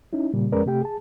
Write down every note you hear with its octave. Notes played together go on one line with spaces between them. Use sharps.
C#4 D#4 E4
A#2 C#3 G3
F2 G#3 C#4 A#4 B4 D5
C3 A3 G4 G5
G#4 A5